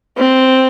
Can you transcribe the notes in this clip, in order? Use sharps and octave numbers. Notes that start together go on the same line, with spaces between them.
C4